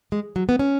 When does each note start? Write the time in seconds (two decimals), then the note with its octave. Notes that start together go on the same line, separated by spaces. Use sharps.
0.12 G#3
0.36 F#3
0.49 B3
0.59 C#4